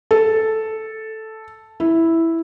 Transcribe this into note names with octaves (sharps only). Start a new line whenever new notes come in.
A4
E4